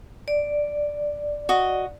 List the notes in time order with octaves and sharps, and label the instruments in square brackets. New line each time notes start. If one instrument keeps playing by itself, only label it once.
[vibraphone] D5
[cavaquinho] F#4 D#5